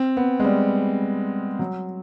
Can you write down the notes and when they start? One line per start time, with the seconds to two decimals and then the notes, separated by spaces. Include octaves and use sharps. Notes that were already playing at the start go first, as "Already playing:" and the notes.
Already playing: C4
0.17 B3
0.40 G#3
0.44 G3
1.59 F#3